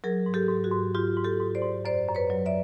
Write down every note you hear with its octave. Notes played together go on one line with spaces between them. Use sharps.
F#3 G#4 A#4
G#2
G4 A4
G#2
F#4 G#4
G#2
G#2 F4 G4
G#2
G4 A4
G#2
C5 D5
G#2
F#2 C5 D5
F#2
B4 C#5
F#3
D5 E5